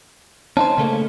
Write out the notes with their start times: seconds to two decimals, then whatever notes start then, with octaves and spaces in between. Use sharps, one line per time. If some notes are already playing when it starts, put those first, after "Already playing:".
0.57 C#4 D#4 C5 A5
0.78 C#3 A3 A#3